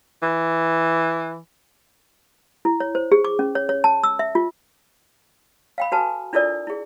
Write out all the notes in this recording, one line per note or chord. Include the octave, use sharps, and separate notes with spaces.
E3
E4
C#5
C5
G#4
D6
C#4
C#5
C#5
A5
E6
E5
F4
F5 G5 B5
F#4 A4 B4 G#5 A5
D4 E4 F4 A4 A#4 D5
E4 G#4